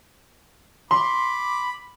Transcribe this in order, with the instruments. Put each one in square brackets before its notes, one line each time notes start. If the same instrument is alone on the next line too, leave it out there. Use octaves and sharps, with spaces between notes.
[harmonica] B5 D6 [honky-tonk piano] C6